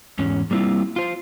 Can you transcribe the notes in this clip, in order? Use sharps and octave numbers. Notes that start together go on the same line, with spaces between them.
E2 G#2 C#4
G3 A#3 C4 E4 F4
F4 C5